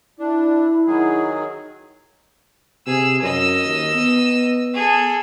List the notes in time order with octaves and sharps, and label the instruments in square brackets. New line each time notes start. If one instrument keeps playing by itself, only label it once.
[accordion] D4 [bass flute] E4
[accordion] D#3 F#3 G#4
[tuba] C3 [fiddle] G#4 E6
[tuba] F#2 [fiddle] D#5 E6
[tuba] D#2
B3
[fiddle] G#4 A4